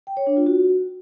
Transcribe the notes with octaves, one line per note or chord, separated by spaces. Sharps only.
G5
C#5
D4
F4
F#4